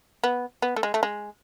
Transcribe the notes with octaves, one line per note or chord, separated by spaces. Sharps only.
B3
B3
A3
G#3
A3
G#3